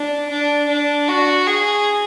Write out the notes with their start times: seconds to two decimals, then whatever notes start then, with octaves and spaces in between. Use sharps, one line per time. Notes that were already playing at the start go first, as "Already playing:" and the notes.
Already playing: D4
0.30 D4
0.69 D4
1.08 F#4
1.46 G#4